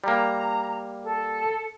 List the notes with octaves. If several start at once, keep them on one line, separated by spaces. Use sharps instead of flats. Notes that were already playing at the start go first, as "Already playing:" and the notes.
G3 A#3 A#5
A4